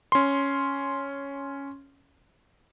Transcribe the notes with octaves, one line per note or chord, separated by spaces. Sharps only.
C#4 C6